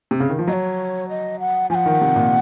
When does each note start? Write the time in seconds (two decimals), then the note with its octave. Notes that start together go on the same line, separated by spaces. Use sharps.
0.11 C3
0.20 C#3
0.29 D#3
0.39 F3
0.47 F#3 D#5
0.53 C#5
1.09 D#5
1.40 F#5
1.70 F3 G#5
1.75 F#5
1.86 D#3
2.01 C3
2.16 A#2